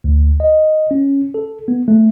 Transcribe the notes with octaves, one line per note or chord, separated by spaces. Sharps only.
D2
D#5
C#4
A4
B3
A3